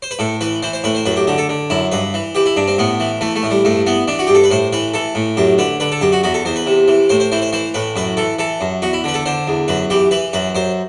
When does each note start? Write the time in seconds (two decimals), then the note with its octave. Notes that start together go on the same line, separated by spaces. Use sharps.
0.02 C5
0.11 B4
0.19 A2 A4
0.41 E3 B4
0.62 E3 C5
0.73 C5
0.84 A2 B4
0.95 C5
1.06 F#2 B4
1.16 G4
1.27 D3 G4
1.38 A4
1.49 D3
1.70 F#2 E4
1.92 G2 B4
2.14 E3
2.35 E3 G4
2.46 E4
2.56 G2 D4
2.67 C4
2.78 A2 B3
3.00 E3
3.21 E3 A3
3.36 A3
3.43 A2
3.51 G3
3.65 G2 A3
3.87 E3 B3
4.08 E3 D4
4.19 F#4
4.27 G2 G4
4.35 A4
4.44 B4
4.51 A2 C5
4.73 E3 B4
4.94 E3 A4
5.15 A2
5.37 F#2 G4
5.58 D3 B4
5.80 D3 B4
5.92 A4
6.01 F#2 G4
6.12 F#4
6.24 E2 F#4
6.34 A4
6.45 E2 C5
6.56 B4
6.66 C3
6.88 E3
7.09 A2 C5
7.20 C5
7.32 E3 C5
7.42 C5
7.53 E3 C5
7.74 A2 B4
7.96 F#2 B4
8.17 E3 A4
8.39 E3 A4
8.61 F#2
8.82 E2 F#4
8.93 E4
9.04 D3 B4
9.14 A4
9.26 D3 C5
9.47 E2
9.68 F#2 B4
9.90 E3 G4
10.11 E3 B4
10.33 F#2 B4
10.55 F#2 C5